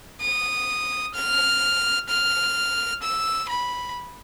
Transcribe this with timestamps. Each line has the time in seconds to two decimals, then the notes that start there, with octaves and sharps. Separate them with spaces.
0.21 D#6
1.14 F6
2.09 F6
3.03 E6
3.49 B5